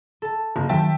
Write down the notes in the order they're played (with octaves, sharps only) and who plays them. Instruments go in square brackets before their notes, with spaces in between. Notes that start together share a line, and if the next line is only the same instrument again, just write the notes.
[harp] A4 A5
[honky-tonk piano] F#1 [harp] A#4
[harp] D#3 [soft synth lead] F#3 [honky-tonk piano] E5 G5 A5